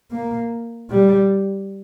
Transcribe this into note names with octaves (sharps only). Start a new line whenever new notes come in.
A#3
G3